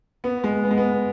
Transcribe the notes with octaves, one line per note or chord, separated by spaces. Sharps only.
B3
G#3
B3
G#3
B3